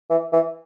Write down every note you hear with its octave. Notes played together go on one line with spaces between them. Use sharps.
E3
E3